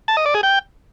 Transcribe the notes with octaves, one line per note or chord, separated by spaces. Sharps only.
A5
D#5
D5
G#4
G5